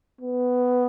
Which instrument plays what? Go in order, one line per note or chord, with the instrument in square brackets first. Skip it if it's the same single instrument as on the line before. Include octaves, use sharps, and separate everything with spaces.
[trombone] B3